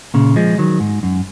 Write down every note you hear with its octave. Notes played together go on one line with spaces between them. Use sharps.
A#2 C#3
F3 G#3
D#3 F#3
G#2
F#2